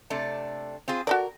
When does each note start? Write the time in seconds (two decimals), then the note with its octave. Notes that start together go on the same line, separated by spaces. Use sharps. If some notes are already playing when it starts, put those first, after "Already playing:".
0.10 C3 A3 D4
0.88 C4 F4 G#4
1.07 F#4 A4 A#4 D5